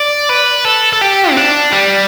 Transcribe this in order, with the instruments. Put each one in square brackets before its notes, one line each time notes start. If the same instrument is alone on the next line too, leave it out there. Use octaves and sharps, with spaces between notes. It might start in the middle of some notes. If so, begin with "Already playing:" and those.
Already playing: [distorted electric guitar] D5
B4
A4
A4
G4
C4
D4
G3